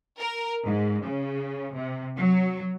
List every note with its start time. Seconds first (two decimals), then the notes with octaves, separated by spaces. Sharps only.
0.20 A#4
0.66 G#2
1.05 C#3
1.76 C3
2.17 F#3